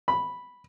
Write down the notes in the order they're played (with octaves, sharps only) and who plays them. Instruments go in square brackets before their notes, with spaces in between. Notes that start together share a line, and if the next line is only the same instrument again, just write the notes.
[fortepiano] B5